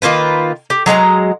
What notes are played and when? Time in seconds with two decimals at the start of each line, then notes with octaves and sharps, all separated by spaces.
0.02 D#3 A#3 F4 B4
0.70 G4
0.86 F#3 G#3 F#5 A#5